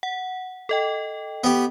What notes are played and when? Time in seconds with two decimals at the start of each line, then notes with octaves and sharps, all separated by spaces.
0.03 F#5
0.69 A4 D#5 G5
1.44 B3 G4